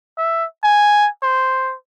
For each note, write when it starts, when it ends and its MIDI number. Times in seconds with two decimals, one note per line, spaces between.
0.18 0.45 76
0.63 1.09 80
1.23 1.75 72